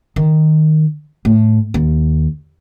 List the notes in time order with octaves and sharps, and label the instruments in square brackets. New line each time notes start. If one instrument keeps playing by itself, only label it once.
[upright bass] D#3
A2
D#2